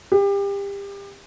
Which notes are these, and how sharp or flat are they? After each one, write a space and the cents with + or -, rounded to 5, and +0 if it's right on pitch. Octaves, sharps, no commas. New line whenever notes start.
G4 +30